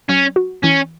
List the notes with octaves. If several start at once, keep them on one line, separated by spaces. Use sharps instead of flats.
F#3 C#4
F#4
E3 C#4